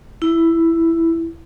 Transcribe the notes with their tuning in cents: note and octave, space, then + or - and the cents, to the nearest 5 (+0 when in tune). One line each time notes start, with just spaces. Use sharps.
E4 +5